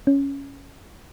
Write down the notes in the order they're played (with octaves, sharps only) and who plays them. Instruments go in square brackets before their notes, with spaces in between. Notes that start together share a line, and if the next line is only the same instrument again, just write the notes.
[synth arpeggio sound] C#4